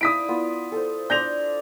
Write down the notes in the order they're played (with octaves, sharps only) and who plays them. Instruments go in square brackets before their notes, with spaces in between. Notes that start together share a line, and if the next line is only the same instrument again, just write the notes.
[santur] E4 D5 F5 [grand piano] D#6 B6 D7
[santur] B3 F4
A4 C5
[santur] D4 D5 C6 [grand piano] G6 A#6 F7